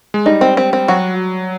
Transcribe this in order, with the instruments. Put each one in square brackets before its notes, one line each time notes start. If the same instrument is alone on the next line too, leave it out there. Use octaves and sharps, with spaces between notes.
[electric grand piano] G#3
[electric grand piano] G3 [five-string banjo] D#4
[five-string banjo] C4
C4
C4
[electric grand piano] F#3 [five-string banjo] F#4